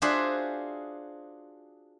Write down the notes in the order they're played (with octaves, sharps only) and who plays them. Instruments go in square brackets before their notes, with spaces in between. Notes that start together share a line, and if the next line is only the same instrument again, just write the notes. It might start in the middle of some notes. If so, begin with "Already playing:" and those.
[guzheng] D4 F4 F#4 G#4 C5 E5